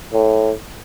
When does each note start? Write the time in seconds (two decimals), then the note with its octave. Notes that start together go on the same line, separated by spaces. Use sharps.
0.13 A2